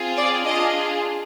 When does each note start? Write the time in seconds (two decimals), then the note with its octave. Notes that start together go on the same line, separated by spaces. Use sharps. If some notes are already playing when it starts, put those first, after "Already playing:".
Already playing: C4 F4 G#4
0.17 D5
0.45 D4 F4 G#4 D#5